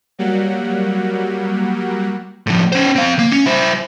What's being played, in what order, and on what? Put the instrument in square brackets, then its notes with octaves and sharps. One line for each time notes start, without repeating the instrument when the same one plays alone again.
[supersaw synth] F#3 G3 A#3 F#5
[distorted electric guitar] A2 F3
C#4 C5
C4 F5
A#3
C#4
E4 C5